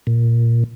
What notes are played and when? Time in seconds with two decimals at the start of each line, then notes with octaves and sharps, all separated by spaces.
0.07 A#2